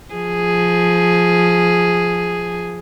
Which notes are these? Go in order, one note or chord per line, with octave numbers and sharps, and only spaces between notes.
F3 G#4